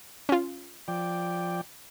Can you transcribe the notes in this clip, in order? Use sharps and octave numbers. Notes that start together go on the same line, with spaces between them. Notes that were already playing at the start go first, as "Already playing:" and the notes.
C#4 F4
F3 D5 G5